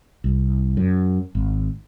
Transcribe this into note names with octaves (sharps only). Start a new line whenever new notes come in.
C2
F#2
G#1